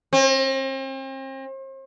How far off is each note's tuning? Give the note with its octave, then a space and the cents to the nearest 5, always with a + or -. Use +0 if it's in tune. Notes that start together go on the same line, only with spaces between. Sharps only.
C4 +40